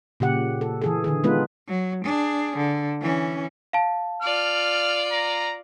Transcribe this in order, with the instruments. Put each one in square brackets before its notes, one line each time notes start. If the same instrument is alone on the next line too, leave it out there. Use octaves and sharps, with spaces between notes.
[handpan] A#2 C#3 G4 F#5
A4
E3 G#4 A4
D3 D#3 G#4
G#3 B3 D#4 F4 B4
[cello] F#3
D4 G#4
D3
E3 C#4
[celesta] F5 A5
[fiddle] F4 D5 [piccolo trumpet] F6
[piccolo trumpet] A#5